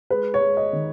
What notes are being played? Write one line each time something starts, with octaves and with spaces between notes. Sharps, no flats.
G#3 B4
C#5
G#3
D#5
D#3